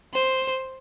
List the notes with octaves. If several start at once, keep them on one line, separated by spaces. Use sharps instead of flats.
C5